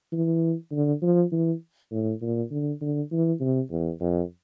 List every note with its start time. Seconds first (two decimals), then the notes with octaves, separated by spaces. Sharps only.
0.12 E3
0.71 D3
1.02 F3
1.32 E3
1.91 A2
2.21 A#2
2.51 D3
2.81 D3
3.12 E3
3.40 C3
3.71 E2
4.01 F2